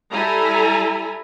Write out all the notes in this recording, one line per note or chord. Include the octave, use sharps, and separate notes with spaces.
G3 E4 A4 G#5 A#5